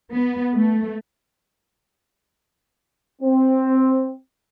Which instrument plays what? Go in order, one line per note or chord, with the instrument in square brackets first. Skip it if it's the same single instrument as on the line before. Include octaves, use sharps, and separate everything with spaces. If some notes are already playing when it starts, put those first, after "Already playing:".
[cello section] B3
A3
[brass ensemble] C4